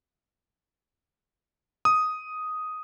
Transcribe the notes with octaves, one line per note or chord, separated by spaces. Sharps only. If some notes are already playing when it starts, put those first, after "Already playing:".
D#6